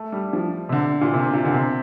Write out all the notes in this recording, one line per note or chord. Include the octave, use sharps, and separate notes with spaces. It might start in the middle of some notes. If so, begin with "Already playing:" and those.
Already playing: A3
G3
F3
C3
D3
A#2
C3
A#2
D3
C3